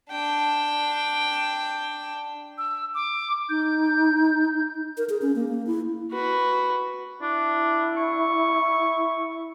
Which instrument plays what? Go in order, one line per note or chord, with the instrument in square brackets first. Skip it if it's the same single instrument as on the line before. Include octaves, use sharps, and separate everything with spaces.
[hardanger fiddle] D4 G5
[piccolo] E6
D6
[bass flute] D#4 [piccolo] G6
[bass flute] A#4
G#4
C#4
A#3
A#3
E4
[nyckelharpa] F#4 B4
[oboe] D4 [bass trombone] E4
[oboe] C#6